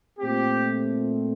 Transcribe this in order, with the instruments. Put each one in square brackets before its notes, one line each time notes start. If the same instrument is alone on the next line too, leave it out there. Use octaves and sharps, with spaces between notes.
[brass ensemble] A#2 A3 C4 G4